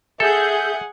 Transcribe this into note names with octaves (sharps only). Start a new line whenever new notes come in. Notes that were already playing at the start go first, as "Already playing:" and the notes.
G#4 A4 E5 F#5 G#5 G6